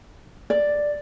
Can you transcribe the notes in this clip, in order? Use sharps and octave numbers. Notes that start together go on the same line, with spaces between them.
D5